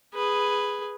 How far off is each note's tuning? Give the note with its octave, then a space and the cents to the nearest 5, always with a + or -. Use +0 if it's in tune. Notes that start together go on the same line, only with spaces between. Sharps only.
G#4 -5 B4 +0